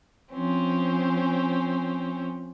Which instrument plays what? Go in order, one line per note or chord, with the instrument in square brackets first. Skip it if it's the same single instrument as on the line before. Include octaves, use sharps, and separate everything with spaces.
[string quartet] F3 C4 C#4